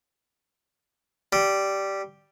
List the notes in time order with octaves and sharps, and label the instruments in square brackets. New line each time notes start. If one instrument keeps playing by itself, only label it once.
[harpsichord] G3